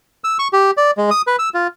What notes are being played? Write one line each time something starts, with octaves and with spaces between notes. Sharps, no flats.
E6
C#6
G4
D5
G#3
D#6
B4
E6
F4